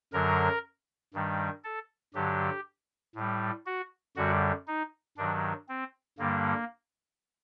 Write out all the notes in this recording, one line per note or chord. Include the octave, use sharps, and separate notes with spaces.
F#2 D3 F#3 A#4
G2 D#3 G3
A4
G2 D3 F#3 G4
A2 G3
F#4
F#2 D3 G3 F#4
D#4
G2 D#3 F#3 D4
C4
G2 D3 G3 A#3